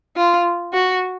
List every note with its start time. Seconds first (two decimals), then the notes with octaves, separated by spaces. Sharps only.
0.17 F4
0.74 F#4